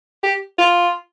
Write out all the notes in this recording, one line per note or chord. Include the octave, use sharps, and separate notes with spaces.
G4
F4